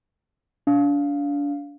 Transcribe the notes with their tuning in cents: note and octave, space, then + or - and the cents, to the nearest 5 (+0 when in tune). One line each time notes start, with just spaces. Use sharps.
D4 -35 F5 +5